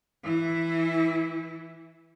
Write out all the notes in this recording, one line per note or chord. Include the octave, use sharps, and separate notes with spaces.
E3 E4